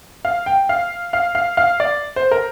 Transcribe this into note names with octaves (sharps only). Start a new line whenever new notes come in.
F5
G5
F5
F5
F5
F5
D5
C5
A#4